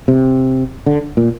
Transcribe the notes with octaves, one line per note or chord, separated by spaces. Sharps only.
C3
D3
A#2